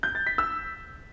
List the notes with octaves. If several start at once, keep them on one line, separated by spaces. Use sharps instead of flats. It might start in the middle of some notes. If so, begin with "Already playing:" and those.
G6
A6
B6
E6